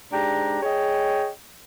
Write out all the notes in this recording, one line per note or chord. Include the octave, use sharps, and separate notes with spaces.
G#2 D4 G4 A#5
G#4 C#5 D#5 G5